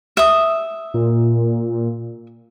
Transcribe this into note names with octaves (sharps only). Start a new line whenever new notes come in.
E5 D#6
A#2